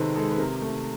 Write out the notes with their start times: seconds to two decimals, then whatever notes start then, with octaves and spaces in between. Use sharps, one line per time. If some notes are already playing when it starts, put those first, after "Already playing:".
Already playing: C3 D#3 G#3 C4 A4 B4
0.16 G#3 A4
0.31 B4
0.38 C3 A#4
0.62 A3